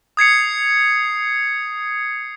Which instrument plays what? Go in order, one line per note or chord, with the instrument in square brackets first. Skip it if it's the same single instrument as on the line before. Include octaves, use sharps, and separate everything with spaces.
[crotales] D#6 G#6 C7 C#7